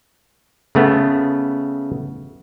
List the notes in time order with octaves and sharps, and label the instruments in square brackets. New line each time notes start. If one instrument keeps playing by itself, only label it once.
[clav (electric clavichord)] C#3 A3 B3